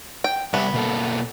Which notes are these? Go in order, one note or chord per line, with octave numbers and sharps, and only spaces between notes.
G5
C3 G3 B3 E5
B2 A#3 A4